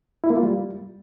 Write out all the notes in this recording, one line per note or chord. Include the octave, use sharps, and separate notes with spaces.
E4
A#3
F4
G3